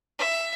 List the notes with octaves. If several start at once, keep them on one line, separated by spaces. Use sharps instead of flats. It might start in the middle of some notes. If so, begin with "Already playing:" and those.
E5